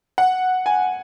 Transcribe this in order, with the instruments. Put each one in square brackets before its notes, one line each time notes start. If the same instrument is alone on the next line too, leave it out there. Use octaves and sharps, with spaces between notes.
[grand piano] F#5
G#5